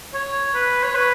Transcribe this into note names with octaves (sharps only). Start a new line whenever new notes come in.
C#5
B4
C#5
B4